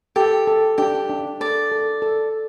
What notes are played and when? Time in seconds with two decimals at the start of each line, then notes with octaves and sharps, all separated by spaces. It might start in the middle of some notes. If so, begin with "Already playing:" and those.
0.16 G4 A4
0.47 A4
0.78 D4 G4
1.10 D4
1.41 A4 D5
1.71 A4
2.02 A4